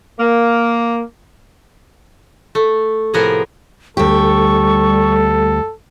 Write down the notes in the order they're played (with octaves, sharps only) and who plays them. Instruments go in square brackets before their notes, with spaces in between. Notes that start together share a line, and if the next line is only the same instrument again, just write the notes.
[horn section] A#3
[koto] A3
A2 C3 F3 B3 G#4 A#4
[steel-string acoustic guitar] D2 G4 [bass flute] G3 [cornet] A4 [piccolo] C#6